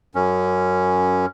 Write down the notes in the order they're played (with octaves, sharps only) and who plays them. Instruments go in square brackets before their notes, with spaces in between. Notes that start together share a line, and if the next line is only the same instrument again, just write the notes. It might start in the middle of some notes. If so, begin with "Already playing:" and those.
[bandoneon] F#2 C#4